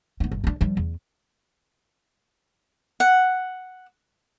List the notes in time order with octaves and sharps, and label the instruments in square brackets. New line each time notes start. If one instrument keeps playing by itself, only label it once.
[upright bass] B3 D#4
G1
C#4 D4
F3 G3
E2
[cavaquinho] F#5